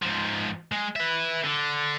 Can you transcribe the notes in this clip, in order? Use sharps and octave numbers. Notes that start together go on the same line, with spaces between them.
G#2 F3
G#3
B4 E5
D3